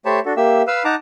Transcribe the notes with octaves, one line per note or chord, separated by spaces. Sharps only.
A3 G4 C5 C#5 A5 B5
D4 F#4 A4
A#3 G4 E5 E6
B4 F5 B5 E6
D#4 F#5 A5 A#5 D6